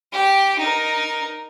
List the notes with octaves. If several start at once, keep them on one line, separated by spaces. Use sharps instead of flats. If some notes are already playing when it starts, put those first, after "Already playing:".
G4 G5
D#4 A#4